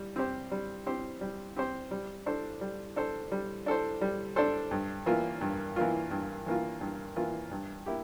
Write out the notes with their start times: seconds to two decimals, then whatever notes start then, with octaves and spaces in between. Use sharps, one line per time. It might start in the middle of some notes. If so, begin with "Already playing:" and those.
Already playing: G3
0.16 C4 G4 C5
0.51 G3
0.86 C4 G4 C5
1.21 G3
1.56 C4 G4 C5
1.91 G3
2.26 D4 A4 C5
2.61 G3
2.96 D4 A4 C5
3.31 G3
3.66 D4 A4 C5
4.01 G3
4.36 D4 A4 C5
4.71 G2
5.06 E3 A#3 F4
5.41 G2
5.76 E3 A#3 F4
6.11 G2
6.46 E3 A#3 F4
6.81 G2
7.16 E3 A#3 F4
7.51 G2
7.86 A#3 E4 G4